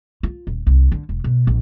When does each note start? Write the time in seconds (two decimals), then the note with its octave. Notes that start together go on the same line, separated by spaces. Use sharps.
0.23 F4
0.47 D#1
0.67 C2
0.92 D3
1.09 E1
1.24 B2
1.47 A#1